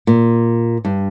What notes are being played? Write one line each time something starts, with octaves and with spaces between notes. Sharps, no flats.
A#2
G2